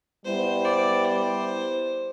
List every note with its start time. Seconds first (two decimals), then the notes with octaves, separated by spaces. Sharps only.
0.24 G3 B3 E4 C5
0.64 D5
1.05 C5